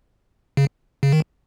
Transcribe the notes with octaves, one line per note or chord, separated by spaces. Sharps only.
C#3
C#3
D#3